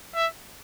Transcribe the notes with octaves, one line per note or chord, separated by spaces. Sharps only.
E5